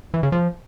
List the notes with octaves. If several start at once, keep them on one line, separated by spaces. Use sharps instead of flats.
E3
C#3
F3